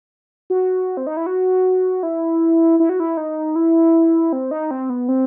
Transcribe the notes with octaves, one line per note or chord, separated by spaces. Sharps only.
F#4
C4
D#4
E4
F#4
E4
E4
F#4
E4
D#4
E4
C4
D#4
C4
B3
C4